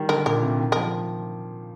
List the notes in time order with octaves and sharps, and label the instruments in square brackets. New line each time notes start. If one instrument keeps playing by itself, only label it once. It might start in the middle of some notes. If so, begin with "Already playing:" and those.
Already playing: [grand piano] D#3 G3
[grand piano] D3 [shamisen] A#4
[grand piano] A#2 [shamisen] A#4
[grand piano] C3
D#3
[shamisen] A#4
[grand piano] F3